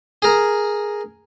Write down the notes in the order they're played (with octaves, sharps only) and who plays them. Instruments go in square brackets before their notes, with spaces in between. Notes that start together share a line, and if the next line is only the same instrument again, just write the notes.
[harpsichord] G#4 A#4